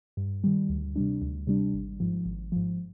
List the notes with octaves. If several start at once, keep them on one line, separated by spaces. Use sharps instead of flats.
G2
D#3 G3
D2
C3 G3 D4
D2
C3 G3 D4
G#1
G#2 F3
G#1
G#2 F3